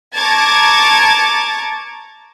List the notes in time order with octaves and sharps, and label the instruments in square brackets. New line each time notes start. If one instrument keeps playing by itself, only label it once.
[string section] A5 A#5 C#6 D6 G#6 A6